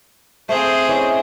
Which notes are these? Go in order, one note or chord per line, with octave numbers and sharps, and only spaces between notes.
A3 C4 G#4 C5 F5
E3 C#4 D#5